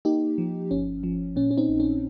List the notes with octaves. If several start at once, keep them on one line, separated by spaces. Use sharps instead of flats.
A#3 D#4 G4
F3
G1 C#4
F3
A#2 C#4
C#4
C4 D#4
A#1
C#4